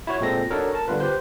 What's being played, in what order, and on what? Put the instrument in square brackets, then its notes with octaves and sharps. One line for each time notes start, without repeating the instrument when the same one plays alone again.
[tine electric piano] E4 F#4 C#5
A#2 G#3 C4 A4 A#6
D4 D#4 F#4 A4 A#4 C#5
A#4 A5
D3 G3 B3 F4 B4
G4 B4 C5